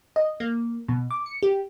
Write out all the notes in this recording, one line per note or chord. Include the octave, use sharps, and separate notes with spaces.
D#5
A#3
B2
D6
C#7
G4